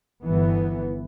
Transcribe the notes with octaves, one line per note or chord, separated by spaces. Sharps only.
G1 E3 B3